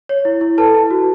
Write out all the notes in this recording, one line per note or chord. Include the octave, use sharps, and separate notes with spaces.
C#5
E4
E4
A4 B4 A5
E4
F#4